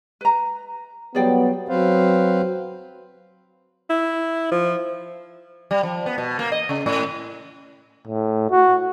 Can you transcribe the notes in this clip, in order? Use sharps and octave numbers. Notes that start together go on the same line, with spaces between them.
B4 A#5
F#3 G3 B3 G#4 D5 G5
F#3 C4 B4 C5 F5
E4
F3
G3
F3
B3
B2
A#3
D#5
C#3
A2
A2
F#4